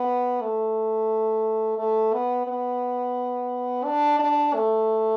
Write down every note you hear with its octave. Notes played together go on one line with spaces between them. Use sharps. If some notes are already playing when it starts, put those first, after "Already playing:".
Already playing: B3
A3
A3
B3
B3
D4
D4
A3